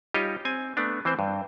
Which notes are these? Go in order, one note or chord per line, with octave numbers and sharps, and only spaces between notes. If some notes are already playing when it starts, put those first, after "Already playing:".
G3 D#4 F4 G4 C#5 D#5
C4 G#5
A3 B3 D4
E3 C4 C5
G2